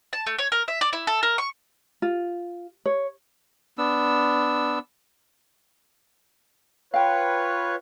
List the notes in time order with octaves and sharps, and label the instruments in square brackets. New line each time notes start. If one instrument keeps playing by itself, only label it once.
[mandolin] A5
A3
C#5
A#4
E5
D5
E4
A4
A#4
C#6
[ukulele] F4
C#5
[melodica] B3 D4 E6
[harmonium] F4 B4 C#5 [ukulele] F5 G5